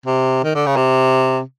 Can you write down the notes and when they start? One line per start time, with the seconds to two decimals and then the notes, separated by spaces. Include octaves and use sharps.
0.06 C3
0.44 D#3
0.55 D3
0.66 C#3
0.77 C3